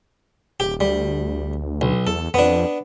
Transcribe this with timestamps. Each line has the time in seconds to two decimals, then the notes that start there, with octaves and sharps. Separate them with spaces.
0.60 D#1 G4
0.80 D2 G3
1.81 B1
2.07 E2 A4
2.34 F2 B3 D4